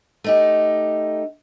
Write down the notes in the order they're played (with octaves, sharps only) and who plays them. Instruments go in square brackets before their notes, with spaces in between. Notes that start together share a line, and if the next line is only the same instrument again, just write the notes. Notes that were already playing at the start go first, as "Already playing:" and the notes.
[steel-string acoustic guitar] A3 D#4 G4